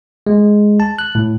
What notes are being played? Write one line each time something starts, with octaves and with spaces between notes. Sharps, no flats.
G#3
A5
F#6
A2